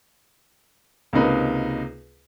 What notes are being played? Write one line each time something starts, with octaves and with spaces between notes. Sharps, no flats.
C#2 C3 A#3 D#4 B4